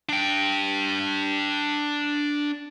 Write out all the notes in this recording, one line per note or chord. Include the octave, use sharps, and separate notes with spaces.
D4 G5